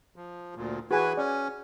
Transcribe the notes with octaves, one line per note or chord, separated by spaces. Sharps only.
F3
D2 A#2
E3 F#4 G#4 B4 G#5
C#4 D5